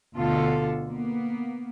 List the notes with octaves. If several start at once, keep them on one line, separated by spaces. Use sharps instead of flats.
D2 B2 D3 F4 A4
A#3 B3